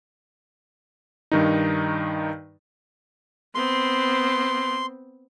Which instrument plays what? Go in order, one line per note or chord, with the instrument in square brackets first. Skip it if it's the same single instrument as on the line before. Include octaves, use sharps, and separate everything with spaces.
[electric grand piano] G2 D#3 D#4
[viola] B3 C4 [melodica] C6